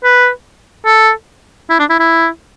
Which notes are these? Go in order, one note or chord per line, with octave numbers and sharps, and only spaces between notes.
B4
A4
E4
D4
E4
E4